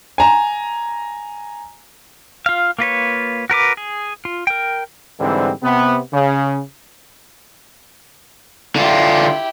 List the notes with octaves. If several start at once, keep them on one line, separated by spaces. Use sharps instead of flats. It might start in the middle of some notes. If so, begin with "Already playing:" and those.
G#5 A#5
F4 F5
A#3 F4 B4 C#5
F#4 A#4 B4 D6
G#4
F4
A#4 G5
G#2 D3 E3 G3 C4
C3 B3
C#3
D3 E4 F4 G4